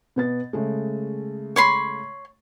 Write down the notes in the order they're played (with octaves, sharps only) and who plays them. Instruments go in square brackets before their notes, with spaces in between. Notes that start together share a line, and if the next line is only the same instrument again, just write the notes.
[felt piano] B2 B3 A6
C#3 G#3 A3
[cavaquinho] C#5 B5 C6